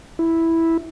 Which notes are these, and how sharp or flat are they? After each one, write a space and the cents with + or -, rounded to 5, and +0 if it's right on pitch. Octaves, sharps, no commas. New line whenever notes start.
E4 -5